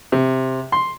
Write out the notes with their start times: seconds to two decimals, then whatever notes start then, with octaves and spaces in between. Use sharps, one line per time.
0.12 C3
0.72 C6